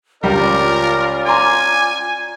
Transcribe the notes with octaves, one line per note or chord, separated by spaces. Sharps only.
C#2 G3 C#4 F4 A#4 D5
G#5 A#5 C6 D6